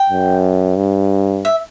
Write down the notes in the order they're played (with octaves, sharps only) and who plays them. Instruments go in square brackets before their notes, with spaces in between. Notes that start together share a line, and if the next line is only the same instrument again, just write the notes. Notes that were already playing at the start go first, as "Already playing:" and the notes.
Already playing: [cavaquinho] G5
[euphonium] F#2
G2
[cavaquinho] E5